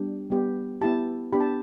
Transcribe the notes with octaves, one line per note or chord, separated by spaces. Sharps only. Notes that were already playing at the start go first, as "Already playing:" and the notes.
Already playing: G3 B3 D4 G4
G3 B3 G4
B3 E4 G4 A5
B3 D4 G4 B5
A5